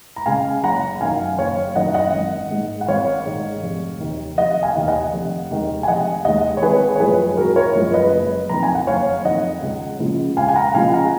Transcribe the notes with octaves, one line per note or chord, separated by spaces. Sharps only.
A#5
C#3 G#3 F5 G#5
F#1 F#5 A#5
F#2 D#3 F5 G#5
F#1 C#5 F5
F#2 D#3 D#5 F#5
D#5 F#5
G#1
G#2 D#3 G#3
F#5
G#1 C#5 F5
G#2 D#3 G#3
F1
D#2 D#3
F1 D#5 F#5
F5 G#5
D#2 D#3
D#5 F#5
F1
D#2 D#3 G#3
G#5
F1 D#5 F#5
D#2 D#3 G#3 D#5 F#5
C#5
G#1 G#4 B4
C#5
F#2 F3 G#3 G#4 B4
G#1 F#4 A#4
A#4 C#5
F#2 F3 G#3
B4 D#5
F#1
F2 D#3 A#5
G#5
F#5
F#1 C#5 F5
F2 D#3 D#5 F#5
C#2
C#3 F3 G#3
C#2 F5 G#5
G#5
F#5 A#5
C#3 F3 G#3 F5 G#5
F#5 A#5